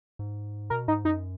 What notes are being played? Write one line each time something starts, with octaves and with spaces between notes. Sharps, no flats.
G#2
B2 A#4
G#2 D#4
F#2 D#4